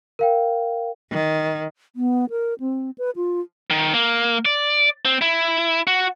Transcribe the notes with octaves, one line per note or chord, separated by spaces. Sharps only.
A#4 F5 G5
D#3
B3
A#4
C4
B4
F4
D#3
A#3
D5
C4
E4
F#4